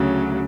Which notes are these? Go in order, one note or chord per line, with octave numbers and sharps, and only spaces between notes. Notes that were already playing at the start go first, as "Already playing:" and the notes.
Already playing: D2 C#3 F#3